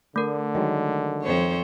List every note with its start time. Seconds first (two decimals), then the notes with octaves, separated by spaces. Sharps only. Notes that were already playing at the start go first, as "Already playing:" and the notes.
0.16 D3 A3 A#4
0.55 D#3 F#3 G#3
1.23 F2 C5 C#5